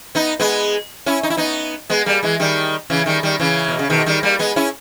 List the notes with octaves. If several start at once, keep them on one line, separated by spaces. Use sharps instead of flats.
B3 D#4
G#3 B3
C#4 E4
D#4
E4
B3 D#4
G#3 B3
G3 A#3
E3 G#3
D#3 G3
C#3 E3
D#3 G3
D#3 G3
C#3 E3
B2
C#3
B2 D#3
D#3 G3
G3 A#3
G#3 B3
C#4 E4